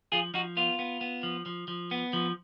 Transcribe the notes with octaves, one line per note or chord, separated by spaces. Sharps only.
F3 F4 G#4
F3 D#4 F#4
B3 F4
B3
B3
F3
F3
F3
B3
F3